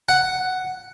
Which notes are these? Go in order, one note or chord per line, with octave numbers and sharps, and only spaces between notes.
F#5